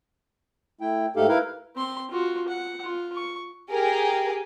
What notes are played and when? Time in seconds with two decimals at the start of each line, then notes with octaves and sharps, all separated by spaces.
0.81 A3 E4 G5
1.16 G#2 A3 D#4 G4 A4 F5
1.28 E4 A#4 B4 F5
1.76 C4 C6
2.11 F4 F#4
2.48 F#5
2.84 F4
3.16 C#6
3.70 G4 G#4 A#4